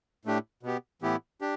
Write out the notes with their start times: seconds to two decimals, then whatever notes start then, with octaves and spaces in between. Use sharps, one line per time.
0.25 A2 A3 D4 G4
0.63 B2 B3 G4
1.02 A2 E3 B3 E4 G4
1.41 D4 G4